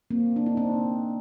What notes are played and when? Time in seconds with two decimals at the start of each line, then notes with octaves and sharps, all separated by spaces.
0.11 A#3 C4
0.36 D4
0.46 D#4
0.57 C4 D4